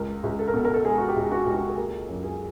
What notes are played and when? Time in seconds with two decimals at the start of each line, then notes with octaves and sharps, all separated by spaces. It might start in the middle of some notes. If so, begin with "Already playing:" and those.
Already playing: C#2 A#4
0.24 C#2
0.39 A4
0.48 A#4
0.54 B2 A4
0.65 A#4
0.74 A4
0.85 G#3 G#4
0.98 F#4
1.08 G4
1.16 C#2
1.32 F#4
1.46 C#2 G4
1.54 F#4
1.70 G#4
1.77 A#3 G4
2.09 F#2
2.24 G#4